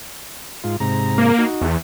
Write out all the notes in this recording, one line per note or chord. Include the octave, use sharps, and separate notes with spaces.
G#2 F4
G#2 C3 A#5
A#3
D#4 F#4
E2